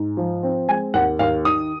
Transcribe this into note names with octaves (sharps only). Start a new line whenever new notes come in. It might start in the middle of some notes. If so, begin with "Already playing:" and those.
Already playing: G#2
F3
C4
G#3 G#5
D#2 F#5
D#2 F5
D#3 D#6